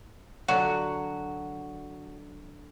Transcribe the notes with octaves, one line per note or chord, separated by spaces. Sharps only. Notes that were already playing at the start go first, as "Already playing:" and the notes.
D3 F#3 F#4